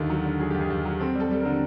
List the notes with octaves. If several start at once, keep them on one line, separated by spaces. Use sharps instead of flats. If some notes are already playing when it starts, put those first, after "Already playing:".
Already playing: D#2 D3 D#3
F#3
D3
F#3 G#4
D#2 G4
G#4
D#2
F#3
C4 A4
G3 A4
G3 A4
A#4
D3